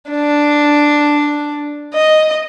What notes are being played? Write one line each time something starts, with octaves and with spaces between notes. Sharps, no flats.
D4
D#5